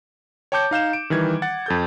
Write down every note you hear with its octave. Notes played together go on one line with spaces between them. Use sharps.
C#5 G5 A5 D6 G6 C#7
D#4 F5 G6 E7
D7
D#3 E3 G3 G#6
F#5 A6
F2 A4 G6